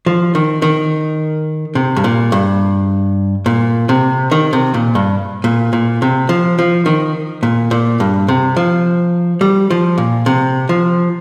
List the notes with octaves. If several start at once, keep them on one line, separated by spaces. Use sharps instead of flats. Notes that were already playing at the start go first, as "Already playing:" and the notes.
F3
D#3
D#3
C3
G2
A#2
G2
A#2
C3
D#3
C3
A#2
G2
A#2
A#2
C3
F3
F3
D#3
A#2
A#2
G2
C3
F3
G3
F3
A#2
C3
F3